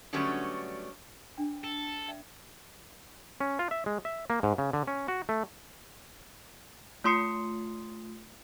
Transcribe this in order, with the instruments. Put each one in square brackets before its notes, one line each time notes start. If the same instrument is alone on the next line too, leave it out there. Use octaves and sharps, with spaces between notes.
[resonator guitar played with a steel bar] D3 F#3 G3 A3 B3 C#4
[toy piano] D4 G5
[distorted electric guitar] A4 [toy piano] G5
[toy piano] D5 E5 G5
[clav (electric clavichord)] C#4
F4
E5
G#3
E5
A#3
G#2
C#3
D3
C#4
F#4
A3
[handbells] A3 F4 C6 D#6 C7 C#7